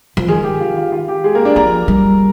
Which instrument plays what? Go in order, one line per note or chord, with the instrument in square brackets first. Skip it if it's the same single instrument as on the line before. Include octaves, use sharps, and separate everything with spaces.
[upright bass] F3
[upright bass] D#3 [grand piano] G#3 G#4
[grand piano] G4
F4
F4
F4
G4
G#3 G#4
A#3 A#4
D4 D5
[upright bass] F3 [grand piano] A#4 A#5
[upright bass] G3